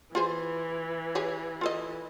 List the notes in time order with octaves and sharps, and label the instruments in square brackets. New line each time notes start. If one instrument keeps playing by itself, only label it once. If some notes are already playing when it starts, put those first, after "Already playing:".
[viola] E3 [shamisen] F4 G#4 C5
[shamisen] G4 G#4 C#5
F4 A4 D#5